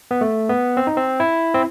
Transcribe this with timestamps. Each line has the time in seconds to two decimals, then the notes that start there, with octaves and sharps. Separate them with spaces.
0.11 B3
0.21 A3
0.49 B3
0.77 C4
0.87 D#4
0.97 C4
1.20 E4
1.54 C4